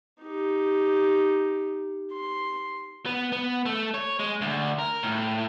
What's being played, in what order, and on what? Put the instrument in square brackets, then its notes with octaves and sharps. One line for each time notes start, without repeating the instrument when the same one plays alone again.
[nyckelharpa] D#4 G4
C6
[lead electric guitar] B3
B3
A3
C#5
G#3
D2
A#4
A2